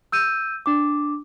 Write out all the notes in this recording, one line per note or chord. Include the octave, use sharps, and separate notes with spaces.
E6 G6 D#7
D4 D6